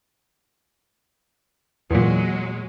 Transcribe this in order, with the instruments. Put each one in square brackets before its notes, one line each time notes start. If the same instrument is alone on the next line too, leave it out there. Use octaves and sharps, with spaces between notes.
[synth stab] E2 A#2 [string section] F#3 G#3